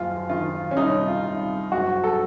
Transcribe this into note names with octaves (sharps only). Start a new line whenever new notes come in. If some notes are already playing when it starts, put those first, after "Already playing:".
Already playing: F#1 D#2 F4
D#3 F4
C#4
C2 D#4
F4
C2
F#1 F#4
A4